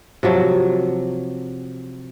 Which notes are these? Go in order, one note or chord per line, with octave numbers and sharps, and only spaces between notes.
C3 F3 F#3